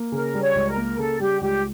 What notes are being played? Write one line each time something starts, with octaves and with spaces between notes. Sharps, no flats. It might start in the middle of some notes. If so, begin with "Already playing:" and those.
Already playing: A#3
C#3 A#4
G3
C#5
C#2
A#4
A#3
C#3 A4
G3 G4
C#2 G4